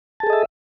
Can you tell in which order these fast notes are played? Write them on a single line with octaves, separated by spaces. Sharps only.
A5 G#4 A4 D#5 E5